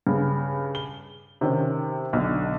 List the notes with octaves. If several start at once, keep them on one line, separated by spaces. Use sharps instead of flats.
G2 C#3
G7
C3 D#3 C#4
B1 D3